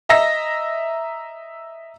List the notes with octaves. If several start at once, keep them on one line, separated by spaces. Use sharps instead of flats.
D#5 E5 A#5 E6 A#6